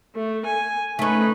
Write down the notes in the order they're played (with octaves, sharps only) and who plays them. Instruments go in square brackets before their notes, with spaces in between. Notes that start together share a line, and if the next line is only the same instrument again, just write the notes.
[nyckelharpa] A3
G#5
[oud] A3 C#4 [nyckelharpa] D#4 B4